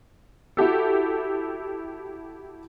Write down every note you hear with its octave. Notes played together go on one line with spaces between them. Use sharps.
E4 F#4 G4 A4